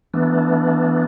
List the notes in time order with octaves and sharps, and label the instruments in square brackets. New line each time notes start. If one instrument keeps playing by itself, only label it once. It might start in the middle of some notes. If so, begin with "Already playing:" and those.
[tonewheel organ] E3 A3 B3 D4